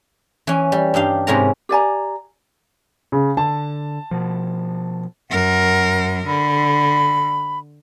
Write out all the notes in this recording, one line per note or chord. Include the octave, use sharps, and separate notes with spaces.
E3 C#4
G3
G2 D#4 G4 F5
G#2 C3 C#4 E4 A#4 A#5
G4 D5 G#5 A#5
C#3
D3 A5
B2 F3
F#2 A#4 F#5
D3 B5